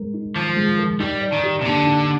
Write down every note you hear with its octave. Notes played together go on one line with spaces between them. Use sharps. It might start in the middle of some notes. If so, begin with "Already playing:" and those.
Already playing: G#3 A#4
D#4
D#3 F3
G#3
A#4
G3 D#4
D5
D#3
G4
C3
D3 A#3
D#4